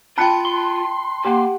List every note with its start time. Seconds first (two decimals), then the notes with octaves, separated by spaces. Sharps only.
0.18 F4 G5 A5 B5 F#6 C#7
0.45 C6
1.25 A#3 G4 F#5